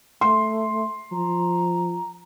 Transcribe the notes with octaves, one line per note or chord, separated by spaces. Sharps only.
A3 C6
F3 A#5